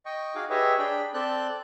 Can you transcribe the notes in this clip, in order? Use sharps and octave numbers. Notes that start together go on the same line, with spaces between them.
D#5 G5 C#6
D#4 F#4 G#4 F5 G#5 D6
G4 G#4 B4 C#5 D#5 E5
D4 G#4 G5 B5
C4 A4 D5 F#6 G6